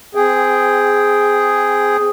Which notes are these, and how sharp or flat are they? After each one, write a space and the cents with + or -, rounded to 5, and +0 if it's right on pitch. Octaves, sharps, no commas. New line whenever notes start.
C4 -25 G#4 +0 G5 +0